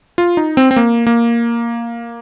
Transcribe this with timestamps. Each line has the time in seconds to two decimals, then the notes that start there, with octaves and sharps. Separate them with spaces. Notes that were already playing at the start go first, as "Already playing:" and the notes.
0.18 F4
0.37 D#4
0.57 C4
0.71 C4
0.76 A#3
1.07 A#3